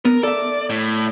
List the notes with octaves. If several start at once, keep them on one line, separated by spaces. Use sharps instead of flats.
B3 A#4
A4 D5 E5
A2